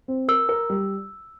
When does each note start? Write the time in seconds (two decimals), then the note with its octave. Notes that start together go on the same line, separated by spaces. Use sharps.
0.08 C4
0.28 A#4 E6
0.49 A#4
0.70 G3